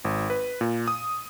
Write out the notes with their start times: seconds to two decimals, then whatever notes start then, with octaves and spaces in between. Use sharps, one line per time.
0.05 G#1
0.30 B4
0.61 A#2
0.88 D#6